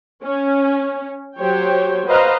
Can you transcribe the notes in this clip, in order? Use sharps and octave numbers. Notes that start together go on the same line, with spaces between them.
C#4
F#3 G4 C5 C#5 G5
F#4 B4 C5 D#5 F5 A#5